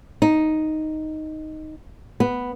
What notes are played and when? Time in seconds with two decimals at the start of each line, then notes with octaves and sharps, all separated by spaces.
0.22 D#4
2.20 B3